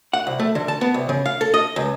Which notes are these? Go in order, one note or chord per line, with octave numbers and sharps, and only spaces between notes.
F#5
C2
A3
D3
A5
B3
C2
C#3
F5
A4
D#5
C#2